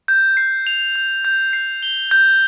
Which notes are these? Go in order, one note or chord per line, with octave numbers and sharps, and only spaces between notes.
G6
C7
F7
G6
G6
C7
G7
G6